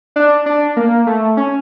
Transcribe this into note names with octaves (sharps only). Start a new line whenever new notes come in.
D4
D4
A#3
A3
C#4